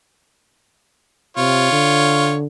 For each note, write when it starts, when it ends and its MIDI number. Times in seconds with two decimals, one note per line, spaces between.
1.37 1.71 48
1.37 2.34 65
1.37 2.34 73
1.72 2.47 50